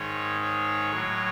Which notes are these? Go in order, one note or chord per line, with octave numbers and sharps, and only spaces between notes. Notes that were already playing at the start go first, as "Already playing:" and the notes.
Already playing: G#2 D#3 G#3 C#5
C#5
A2 F#3